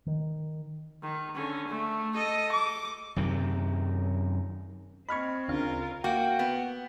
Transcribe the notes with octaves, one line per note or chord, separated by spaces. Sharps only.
D#3
D#3
D3 C#4
A3
A4 D#5
D6
F#2 C3 D#3
C4 D#5 B5 C#6 F6 G#6
D2 C#3 D4 F4 A#4 F5
A#3 F#4 G5
B3